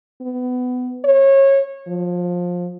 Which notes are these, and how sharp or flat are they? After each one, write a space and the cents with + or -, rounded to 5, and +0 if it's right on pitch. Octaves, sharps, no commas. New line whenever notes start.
B3 +20
C#5 -25
F3 +20